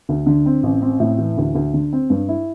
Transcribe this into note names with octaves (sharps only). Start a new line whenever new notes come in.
D2
D3
C4
A1
C4
A2
E3
D2
D2
D3
C4
G2
E4